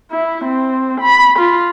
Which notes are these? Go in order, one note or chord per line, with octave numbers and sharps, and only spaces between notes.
E4
C4
B5
F4